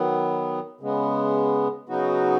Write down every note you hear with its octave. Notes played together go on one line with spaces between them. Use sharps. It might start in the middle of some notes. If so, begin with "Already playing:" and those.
Already playing: D#3 F#3 B3
C#3 G#3 B3
C#3 F#3 B3 D#4 F#4